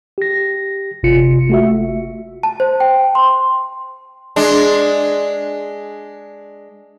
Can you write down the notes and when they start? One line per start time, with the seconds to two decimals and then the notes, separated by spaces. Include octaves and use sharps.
0.18 G4 A#6
1.03 G1 C3 F4 C#7
1.50 A3 F#4 E5
2.43 A5
2.60 C5
2.80 G5
3.15 C6
4.36 G#3 D4